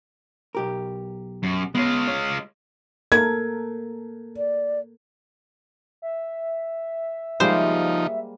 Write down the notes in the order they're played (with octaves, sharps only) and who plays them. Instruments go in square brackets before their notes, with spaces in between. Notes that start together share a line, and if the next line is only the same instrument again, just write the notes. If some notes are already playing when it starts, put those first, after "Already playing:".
[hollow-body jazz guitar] B1 G4 A#4
[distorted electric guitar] F#2
[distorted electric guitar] G#3 F4 [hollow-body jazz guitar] B3 C#5
[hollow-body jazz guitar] C#5
[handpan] A#3 A4 A#4 [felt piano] G#6
[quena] D5
[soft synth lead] E5
[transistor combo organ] F3 D#4 [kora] G3 G#3 A#3 [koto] C5